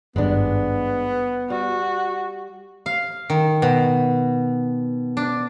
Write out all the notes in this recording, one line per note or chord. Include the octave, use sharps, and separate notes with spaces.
G#1 G2 G#3 B3 D4
G3 F#4
F5
D#3
B2
D4